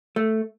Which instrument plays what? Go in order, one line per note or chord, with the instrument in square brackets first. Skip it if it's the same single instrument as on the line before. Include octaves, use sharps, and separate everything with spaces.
[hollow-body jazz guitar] A3